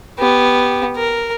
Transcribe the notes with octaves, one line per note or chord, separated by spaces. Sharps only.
B3 G4
A#4